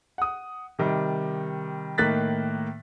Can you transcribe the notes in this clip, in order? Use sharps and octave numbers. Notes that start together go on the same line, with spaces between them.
F#5 D#6
C3 D#3 G3
A2 D#3 A#3 F#6 A6 B6